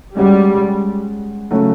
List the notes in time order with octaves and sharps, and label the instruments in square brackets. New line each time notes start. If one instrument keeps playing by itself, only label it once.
[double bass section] G3 [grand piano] G#3 C#4 F#4
[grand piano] C#3 F#3 A3